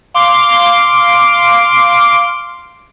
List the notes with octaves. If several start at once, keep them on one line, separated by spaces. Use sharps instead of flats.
F5 C6 D6